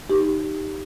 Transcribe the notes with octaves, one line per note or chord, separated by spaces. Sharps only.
D#4 G4